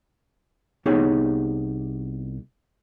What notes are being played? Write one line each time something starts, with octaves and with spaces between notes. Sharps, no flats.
C2 B3 D#4 G4 G#4 C#5